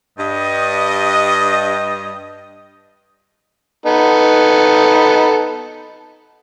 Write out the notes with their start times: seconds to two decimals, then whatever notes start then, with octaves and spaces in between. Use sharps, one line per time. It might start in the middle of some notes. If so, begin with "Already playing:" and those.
0.18 G2 D#5
3.86 B3 D#4 A4